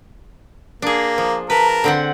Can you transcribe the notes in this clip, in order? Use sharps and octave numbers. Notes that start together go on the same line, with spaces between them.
A#3 D4 G#4
F3
A#4 B4 A5
D3 C4 F#5